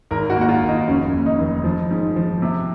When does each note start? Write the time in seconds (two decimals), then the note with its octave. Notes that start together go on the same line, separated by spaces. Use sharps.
0.11 G#1 A#4
0.30 F#4
0.36 A#3
0.41 F#4
0.49 F4
0.62 G#1
0.68 D#4
0.87 F1 C#4
1.14 D#2
1.26 D#4
1.39 F1
1.64 F3
1.91 G#2
2.16 F3
2.42 C3